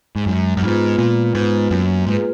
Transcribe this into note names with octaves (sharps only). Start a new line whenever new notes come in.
G#2
F#2 G#3
F#2
G#2 B3 F4 B4
A#2 G#3
G#2 B3 F4 B4
F#2 A#3
G#2 F4 G#4 B4